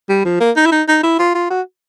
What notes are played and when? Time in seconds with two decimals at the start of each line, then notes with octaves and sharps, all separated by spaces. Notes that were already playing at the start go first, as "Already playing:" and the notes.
0.09 G3
0.25 F3
0.40 A#3
0.56 D#4
0.66 E4
0.72 D#4
0.88 D#4
1.03 E4
1.19 F4
1.35 F4
1.50 F#4